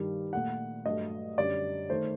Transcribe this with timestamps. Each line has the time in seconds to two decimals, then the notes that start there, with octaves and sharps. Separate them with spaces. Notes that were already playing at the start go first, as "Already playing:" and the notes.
Already playing: G2 D#3 G3
0.33 A#2 A3 F#5
0.85 G2 F#3 A3 D#5
1.38 F#2 D3 G3 D5
1.89 D#3 A3 C5